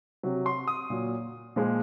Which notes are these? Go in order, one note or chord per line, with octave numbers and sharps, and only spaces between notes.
C3 F#3
C6
D#6
A#2 F#3
A#2 F3 G#3